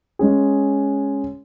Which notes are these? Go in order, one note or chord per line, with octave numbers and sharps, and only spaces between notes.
G#3 C#4 G#4